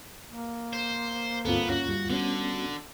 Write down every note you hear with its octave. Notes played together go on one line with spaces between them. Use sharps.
A#3
C5
D2 G2 B3 C4 F4 A4
C#4 F#4
G3
D3 G3 B3 C#4 F#4